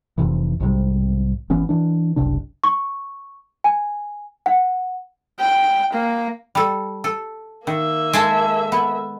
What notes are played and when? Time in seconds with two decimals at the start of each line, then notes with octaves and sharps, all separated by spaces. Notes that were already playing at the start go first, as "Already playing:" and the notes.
0.18 F1 F2 C3 E3
0.60 B1 G#2 C3 G3
1.50 G#1 E3 B3 C#4
1.69 E3 D4
2.16 F#1 C2 C3 D4
2.64 C#6
3.64 G#5
4.46 F#5
5.40 G5
5.93 A#3
6.55 G3 A4
7.04 A4
7.67 D#3 A#3 E5
8.13 G#3 A4
8.72 B3